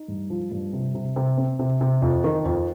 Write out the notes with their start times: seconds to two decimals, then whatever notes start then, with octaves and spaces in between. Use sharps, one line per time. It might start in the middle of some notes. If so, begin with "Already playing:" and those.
Already playing: D#4
0.08 G2
0.30 F3
0.51 G2
0.73 C3
0.95 C3
1.16 C3
1.37 C4
1.59 C3
1.81 C3
2.02 F2
2.24 D#3
2.45 F2